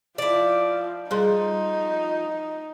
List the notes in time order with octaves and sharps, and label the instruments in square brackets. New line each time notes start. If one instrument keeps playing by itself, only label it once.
[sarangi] F3 [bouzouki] E4 D5
[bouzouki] F3 [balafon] G3 G#4 C6 [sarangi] D#4